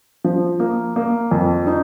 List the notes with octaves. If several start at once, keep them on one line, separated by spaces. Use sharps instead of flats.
F3
A#3
A#3
F2
D#4